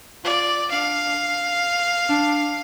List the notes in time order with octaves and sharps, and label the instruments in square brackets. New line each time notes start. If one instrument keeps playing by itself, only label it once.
[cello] F4 [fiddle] D5
[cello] D4 [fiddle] F5
[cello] D4